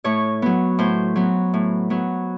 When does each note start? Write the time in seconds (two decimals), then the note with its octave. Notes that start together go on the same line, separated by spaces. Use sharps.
0.04 A2 C#5
0.42 F#3 B3
0.79 A2 C5
1.16 F#3 B3
1.54 A2
1.90 F#3 B3